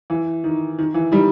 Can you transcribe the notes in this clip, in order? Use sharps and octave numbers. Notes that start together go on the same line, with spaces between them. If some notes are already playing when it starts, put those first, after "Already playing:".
E3
D#3
D#3
E3
D#3 G3